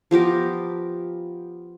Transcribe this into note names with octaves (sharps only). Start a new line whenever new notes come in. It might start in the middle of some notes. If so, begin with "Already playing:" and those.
F3 B3 G4 A#4